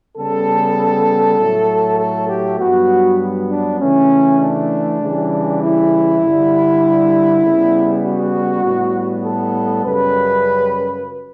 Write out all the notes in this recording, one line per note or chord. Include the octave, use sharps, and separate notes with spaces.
C#3 G3 B3 A4
A2 F#3 A3
A4
G4
G2 F#3 B3 F#4
D4
C#3 E3 A3 C#4
D4
C#3 E3 G3
E4
G2 D3 G3
C#3 G3 B3
F#4
A2 G3 B3
A4
F#2 C#3 G3 B4